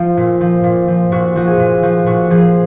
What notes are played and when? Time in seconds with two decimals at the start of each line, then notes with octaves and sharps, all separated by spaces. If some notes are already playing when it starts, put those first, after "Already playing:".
Already playing: F3 F4
0.17 A#2
0.41 F3
0.64 A#2
0.88 F3
1.12 A#2 F#4
1.36 F3 F#4
1.47 G#4
1.59 A#2
1.83 F3 F#4
2.06 A#2 F#4
2.30 F3 G#4